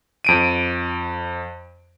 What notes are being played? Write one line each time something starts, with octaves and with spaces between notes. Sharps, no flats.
F2 D7 D#7